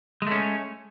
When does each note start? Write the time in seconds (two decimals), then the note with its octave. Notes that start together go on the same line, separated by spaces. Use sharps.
0.22 G#3
0.27 A3
0.31 C#4